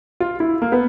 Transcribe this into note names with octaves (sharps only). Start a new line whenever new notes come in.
F4
E4
A#3
B3